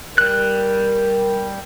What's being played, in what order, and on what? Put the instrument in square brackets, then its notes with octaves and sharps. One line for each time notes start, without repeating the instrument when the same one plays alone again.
[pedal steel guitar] G3 F#6 [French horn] A#4